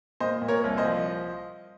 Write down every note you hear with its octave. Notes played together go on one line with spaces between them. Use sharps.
A#2 C5 D#5
A#2
A#4 C#5
C2
C5 D#5
F3